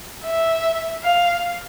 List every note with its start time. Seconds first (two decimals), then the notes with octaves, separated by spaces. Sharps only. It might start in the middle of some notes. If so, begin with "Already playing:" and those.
0.25 E5
1.03 F5